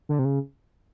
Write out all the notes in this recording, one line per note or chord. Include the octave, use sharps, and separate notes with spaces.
D3
C3
C#3